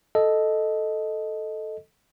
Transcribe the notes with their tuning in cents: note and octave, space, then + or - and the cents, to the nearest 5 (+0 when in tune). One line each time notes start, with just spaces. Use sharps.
A4 -5 D#5 +0